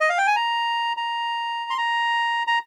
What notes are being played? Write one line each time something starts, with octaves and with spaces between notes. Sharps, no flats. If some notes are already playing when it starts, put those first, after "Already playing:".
D#5
F5
G5
G#5
A#5
A#5
C6
A#5
A#5